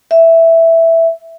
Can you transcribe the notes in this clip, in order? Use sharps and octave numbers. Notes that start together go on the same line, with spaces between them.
E5